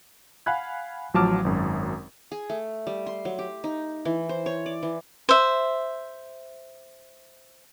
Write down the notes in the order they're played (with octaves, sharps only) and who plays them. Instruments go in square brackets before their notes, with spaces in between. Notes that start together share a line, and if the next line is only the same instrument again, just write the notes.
[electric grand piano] F5 F#5 G#5 B5 F#6 G#6
A1 F3 F#3 A5 D6 F6
G#1 F#2
[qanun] G#4
A3
G3
C6
F#3
G4
D#4
E3
C5
C#5
D5
E3
[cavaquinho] C5 E5